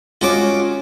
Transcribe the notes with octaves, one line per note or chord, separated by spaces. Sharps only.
G#3 C#4 F4 F#4 C#5 D6